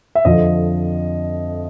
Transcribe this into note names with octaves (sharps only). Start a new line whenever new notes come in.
E5
F2 D3 F3 D#5